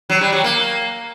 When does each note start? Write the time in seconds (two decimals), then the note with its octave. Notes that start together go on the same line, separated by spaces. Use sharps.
0.10 F#3
0.21 G3
0.33 F#3
0.44 A#3